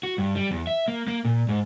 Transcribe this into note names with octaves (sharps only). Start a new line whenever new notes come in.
F#4
G2
G3
E2
E5
A#3
A#3
A#2
G#2